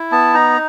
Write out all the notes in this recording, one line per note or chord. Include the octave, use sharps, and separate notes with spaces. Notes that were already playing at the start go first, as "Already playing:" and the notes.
Already playing: E4
B3 A5
D#4 A#5